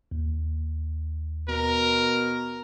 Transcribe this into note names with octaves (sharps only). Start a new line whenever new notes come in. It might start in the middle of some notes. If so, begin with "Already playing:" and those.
D#2
B2 A#4